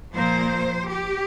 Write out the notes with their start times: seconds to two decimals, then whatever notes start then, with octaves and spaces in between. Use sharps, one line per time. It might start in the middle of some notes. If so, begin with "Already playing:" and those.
0.15 A#2 F3 A#3 C5
0.89 G4